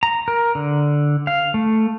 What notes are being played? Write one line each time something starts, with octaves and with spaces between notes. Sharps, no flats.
A#5
A#4
D3
F5
A3